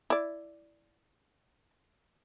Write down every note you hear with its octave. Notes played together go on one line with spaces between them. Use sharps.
E4 D5